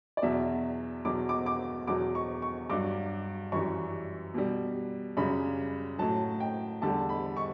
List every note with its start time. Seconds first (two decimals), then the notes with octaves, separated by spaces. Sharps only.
0.17 D5
0.22 E2 B2 F#3 E5
1.05 E2 B2 F#3 D6
1.29 D6
1.46 D6
1.87 E2 B2 F#3 D6
2.15 C#6
2.42 C#6
2.70 G2 F#3 D6
3.52 F#2 E3 G3 C#6
4.34 B2 G3
5.17 F#2 C#3 G3 B5
5.99 A2 F#3 A5
6.40 G5
6.81 E2 D3 G3 A5
7.09 B5
7.37 C#6